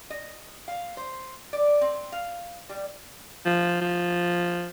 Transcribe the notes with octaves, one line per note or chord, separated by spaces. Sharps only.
D#5
F5
C5
D5
C4
F5
G3
F3
F3